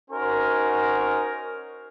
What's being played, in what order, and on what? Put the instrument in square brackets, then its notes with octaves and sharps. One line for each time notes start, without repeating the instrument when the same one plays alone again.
[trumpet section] C#4 D#4 F#4 A#4 C5 G#5